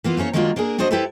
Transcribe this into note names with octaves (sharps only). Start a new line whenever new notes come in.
E3 A#3 B3 F4
A3 A#3 C#4 C#5
D#3 F#3 G#3 A#3 D4 F4
A#3 D4 E4 G#4 A#4
F#3 D4 F#4 C5 D#5
E4 G4 A4 B4 C5 E5